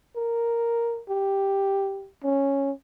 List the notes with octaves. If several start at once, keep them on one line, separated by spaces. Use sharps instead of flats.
A#4
G4
C#4